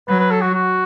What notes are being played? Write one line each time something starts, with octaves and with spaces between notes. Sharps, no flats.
F#3 B4
B4
A4
F#4
F#4